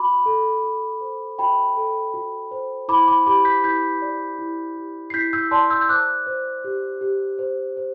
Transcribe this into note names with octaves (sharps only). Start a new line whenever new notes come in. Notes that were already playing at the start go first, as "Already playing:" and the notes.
Already playing: F#4 B5 D6
A4
F#4
C5
F#4 G5 B5
A4
F#4
C5
E4 B5 D6
B5 D6
G4 B5 D6
G6 B6
E4 G6 B6
D5
E4
G4
C7
E4 G6 B6
E6 G6
D5 A5 C6
E6 G6
G6
C5 D6 F#6
C5
G4
G4
C5
C5